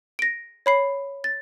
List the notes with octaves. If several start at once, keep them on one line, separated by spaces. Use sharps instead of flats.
A#6 D7
C#5 B5 C7
A6